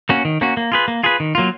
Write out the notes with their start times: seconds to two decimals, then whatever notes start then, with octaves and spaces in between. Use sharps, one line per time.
0.09 A#3 C#4 F#4
0.25 D#3
0.41 A#3 C#4 F#4
0.57 A#3
0.72 F4 G#4 B4
0.88 A#3
1.03 F4 G#4 B4
1.20 D#3
1.35 F#3 A#3 F4